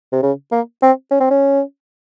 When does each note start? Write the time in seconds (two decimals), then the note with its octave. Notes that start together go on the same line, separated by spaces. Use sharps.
0.12 C3
0.23 C#3
0.52 A#3
0.82 C4
1.11 C#4
1.20 C4
1.30 C#4